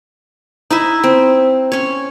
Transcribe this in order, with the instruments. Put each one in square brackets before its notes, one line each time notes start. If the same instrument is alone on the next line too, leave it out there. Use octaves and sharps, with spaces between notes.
[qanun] D#4 E4 E5
C4
C#4 C#5